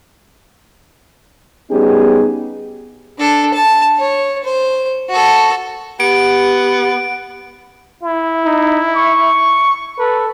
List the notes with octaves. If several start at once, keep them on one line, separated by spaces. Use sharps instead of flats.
G3 B3 C#4 D#4 G4 G#4
D4 A4
A5
C#5
C5
F#4 A4
B3 G4 F#5 D7
E4
D#4
C#6
A4 B4